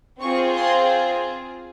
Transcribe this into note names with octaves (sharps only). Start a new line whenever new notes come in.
C4 F4 G#4 C#6
C6